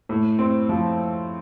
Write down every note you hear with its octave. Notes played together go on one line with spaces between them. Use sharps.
A2
C4
F3